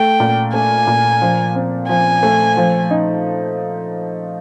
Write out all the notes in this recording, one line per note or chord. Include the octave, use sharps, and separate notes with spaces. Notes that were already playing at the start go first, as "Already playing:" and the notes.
Already playing: A3 G5
A#2
A3 G#5
A#2
F3
C4
F3 G#5
A3
F3
D#4